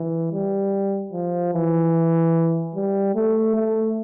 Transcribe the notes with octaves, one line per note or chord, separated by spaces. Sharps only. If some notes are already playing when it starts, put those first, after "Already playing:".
Already playing: E3
G3
F3
E3
G3
A3
A3